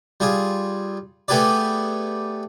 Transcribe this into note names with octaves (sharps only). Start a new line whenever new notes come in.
G3 F4 G#4
A3 B3 G4 G#4 B4 D5